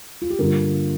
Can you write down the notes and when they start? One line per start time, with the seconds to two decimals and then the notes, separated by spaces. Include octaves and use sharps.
0.22 F4
0.30 G4
0.39 G2 D3 A#3 F4 A#4